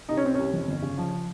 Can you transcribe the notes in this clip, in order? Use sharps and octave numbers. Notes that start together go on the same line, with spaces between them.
C2 D#4
C#4
C3 C4
C2 C#4
F2
G1
C#3
F3